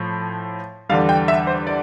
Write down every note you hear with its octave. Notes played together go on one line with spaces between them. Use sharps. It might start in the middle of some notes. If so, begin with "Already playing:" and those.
Already playing: A2 F3
E2 D3 G3 F5
G5
E5
C5
D5